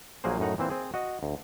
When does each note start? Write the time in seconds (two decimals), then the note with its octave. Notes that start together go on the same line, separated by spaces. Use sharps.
0.24 A#1 F#3 A#3 G#4 C5
0.39 F#2 A2 D#4 F#5 A#5
0.58 A#2 E3 C4 C5
0.70 C4 G#4
0.94 F#4 D#5
1.23 D2